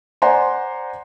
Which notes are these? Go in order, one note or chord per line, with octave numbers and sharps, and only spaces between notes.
C5 D5 F#5 G#5 A#5 C6